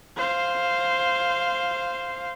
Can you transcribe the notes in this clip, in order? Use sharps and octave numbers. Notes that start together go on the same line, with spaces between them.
C5 F5